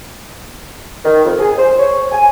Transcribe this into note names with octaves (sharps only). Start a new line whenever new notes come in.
D#3
F2
G#4
C5
C#5
G#5